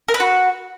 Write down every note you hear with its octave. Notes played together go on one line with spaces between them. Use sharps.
A#4
B4
F#4